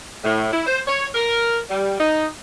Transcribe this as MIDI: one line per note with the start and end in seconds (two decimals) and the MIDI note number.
0.24 0.47 45
0.53 0.66 64
0.67 0.79 72
0.88 1.07 73
1.15 1.59 70
1.70 2.00 55
2.00 2.27 63